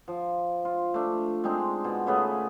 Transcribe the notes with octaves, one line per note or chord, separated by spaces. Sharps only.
F3
F4
A3 D4
G#3 C4 D4 D#4
B2
C#3 A3 B3 G#4